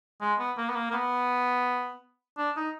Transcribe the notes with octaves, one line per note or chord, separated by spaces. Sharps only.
G#3
B3
A#3
B3
A#3
A#3
B3
D4
D#4